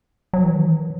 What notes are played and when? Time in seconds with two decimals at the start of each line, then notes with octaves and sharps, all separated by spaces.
0.33 F#3
0.44 E3
0.55 D#3
0.66 E3